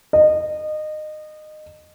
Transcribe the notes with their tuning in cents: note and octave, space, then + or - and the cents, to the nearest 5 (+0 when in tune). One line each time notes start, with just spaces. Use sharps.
D#5 -25